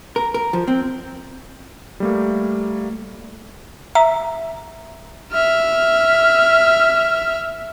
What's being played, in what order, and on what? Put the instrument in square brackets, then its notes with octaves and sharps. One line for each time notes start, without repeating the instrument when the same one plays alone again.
[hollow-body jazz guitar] A#4
A#4
F3
C4
[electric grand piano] G3 A3 A#3
[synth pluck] E5 [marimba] A#5
[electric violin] E5 F6